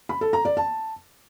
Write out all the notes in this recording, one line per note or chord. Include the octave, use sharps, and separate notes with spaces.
B5
A4
A#5
D5
A5